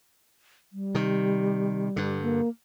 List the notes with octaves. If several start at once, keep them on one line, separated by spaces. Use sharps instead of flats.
G3
C3 D#3
G2 D3
A#3